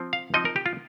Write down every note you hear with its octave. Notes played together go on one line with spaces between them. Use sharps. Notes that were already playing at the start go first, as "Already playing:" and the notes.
Already playing: F3 C4
F5
F3 C4 D#4 D#5
A#4
G4
F4